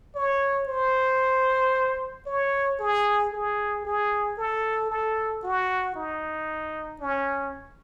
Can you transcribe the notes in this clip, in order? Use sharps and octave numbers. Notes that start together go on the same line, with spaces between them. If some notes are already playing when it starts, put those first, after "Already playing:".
C#5
C5
C#5
G#4
G#4
G#4
A4
A4
F#4
D#4
C#4